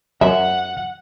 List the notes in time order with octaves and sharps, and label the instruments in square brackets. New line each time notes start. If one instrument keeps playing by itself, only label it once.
[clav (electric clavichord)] F#2 [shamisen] E5 [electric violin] F#5